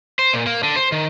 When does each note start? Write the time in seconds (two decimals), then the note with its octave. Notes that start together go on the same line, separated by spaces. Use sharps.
0.19 C5
0.33 A#2
0.47 A#3
0.63 D3
0.76 C5
0.92 D#3